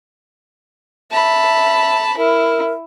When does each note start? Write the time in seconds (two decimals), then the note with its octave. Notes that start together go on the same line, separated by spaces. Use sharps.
1.12 E5 A5 B5
2.17 E4 A#4